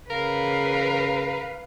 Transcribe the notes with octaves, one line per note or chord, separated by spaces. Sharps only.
C#3 A#4 B4 F5